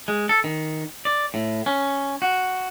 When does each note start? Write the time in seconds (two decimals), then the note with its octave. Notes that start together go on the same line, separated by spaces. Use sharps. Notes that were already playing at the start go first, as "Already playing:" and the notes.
0.08 G#3
0.29 A4
0.44 D#3
1.05 D5
1.34 A2
1.66 C#4
2.22 F#4